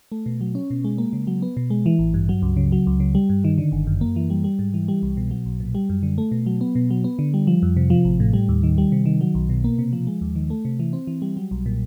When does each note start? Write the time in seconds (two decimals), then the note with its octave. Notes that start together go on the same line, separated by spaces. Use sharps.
0.12 A3
0.26 B2
0.41 F#3
0.55 C#4
0.70 B2
0.84 G#3
0.98 A#3
1.13 C#3
1.27 F#3
1.42 B3
1.57 B2
1.70 G#3
1.86 E3
1.99 A1
2.14 G2
2.29 F#3
2.42 C#2
2.57 C#3
2.72 F#3
2.87 C#2
3.00 C#3
3.15 G3
3.29 G2
3.44 D#3
3.58 D3
3.72 G1
3.87 F#2
4.01 A#3
4.16 E3
4.30 G3
4.44 G3
4.59 G#2
4.74 E3
4.88 G3
5.03 C2
5.17 B2
5.31 F#3
5.46 B1
5.60 A#2
5.75 G3
5.90 F#2
6.03 D3
6.18 A3
6.32 B2
6.46 F#3
6.61 B3
6.75 B2
6.90 F#3
7.04 B3
7.19 D3
7.34 G3
7.47 F3
7.63 F2
7.77 C3
7.90 F3
8.05 A1
8.20 A2
8.33 G3
8.49 D#2
8.63 D#3
8.78 G3
8.92 C3
9.06 D#3
9.21 F#3
9.35 B1
9.49 B2
9.64 A#3
9.79 C3
9.93 F3
10.07 G#3
10.21 D#2
10.35 D#3
10.50 A3
10.65 C3
10.80 E3
10.93 C4
11.07 E3
11.22 G3
11.37 F#3
11.51 B1
11.66 A#2